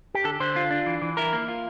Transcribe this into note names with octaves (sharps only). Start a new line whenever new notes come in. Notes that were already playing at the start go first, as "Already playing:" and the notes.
G4
D3 A4
D3 C5
F4
D4
E3
E3
E4 A#4
A#3
F4